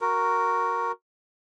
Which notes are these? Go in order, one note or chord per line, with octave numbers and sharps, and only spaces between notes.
F#4 A#4